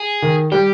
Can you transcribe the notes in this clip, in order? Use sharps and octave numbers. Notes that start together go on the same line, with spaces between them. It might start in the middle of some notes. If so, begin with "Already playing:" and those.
Already playing: G#4
D#3
G3 G4